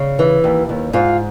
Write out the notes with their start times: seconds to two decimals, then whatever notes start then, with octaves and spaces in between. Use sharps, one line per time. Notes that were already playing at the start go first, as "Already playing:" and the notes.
Already playing: C#3
0.19 E3
0.44 D#2
0.69 D#2
0.93 G#2 F4